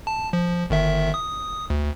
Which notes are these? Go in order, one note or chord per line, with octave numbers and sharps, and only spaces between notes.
A5
F3
G1 D#3 E5
D#6
D2